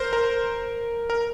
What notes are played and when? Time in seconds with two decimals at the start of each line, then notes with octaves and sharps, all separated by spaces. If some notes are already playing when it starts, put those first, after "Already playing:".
Already playing: A#4 C5
0.13 A#4
1.10 A#4